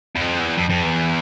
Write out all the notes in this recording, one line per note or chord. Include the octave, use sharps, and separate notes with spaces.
E2
F2
E2
F2
F2
E2